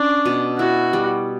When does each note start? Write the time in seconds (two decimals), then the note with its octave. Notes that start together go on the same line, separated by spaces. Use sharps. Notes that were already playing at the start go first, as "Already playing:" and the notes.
Already playing: C#4 D4
0.26 B2
0.59 E4 F#4
0.93 G3